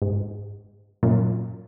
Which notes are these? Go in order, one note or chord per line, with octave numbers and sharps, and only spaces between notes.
G#2
F#2 A#2